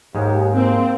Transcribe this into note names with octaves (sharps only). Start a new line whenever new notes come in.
D#2 G#2 G#3
A#3 C4